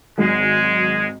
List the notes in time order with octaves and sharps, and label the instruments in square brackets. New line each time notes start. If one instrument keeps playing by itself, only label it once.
[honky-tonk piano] G#1 G#2 F#3 [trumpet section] G#3